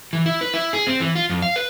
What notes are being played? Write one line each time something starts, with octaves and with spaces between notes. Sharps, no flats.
E3
E4
B4
E4
G#4
C4
E3
F4
F2
F5
B4